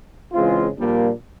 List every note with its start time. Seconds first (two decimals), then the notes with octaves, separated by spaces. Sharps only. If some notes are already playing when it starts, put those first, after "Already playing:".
0.32 C#3 E3 G#3 C4 F4
0.76 A#1 A#2 G3 A#3 D4